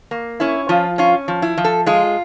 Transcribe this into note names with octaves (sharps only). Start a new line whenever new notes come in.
A#3
C#4 E4
F3 F4
C#4 F4
F3
E4
F3
A4
G#3 F4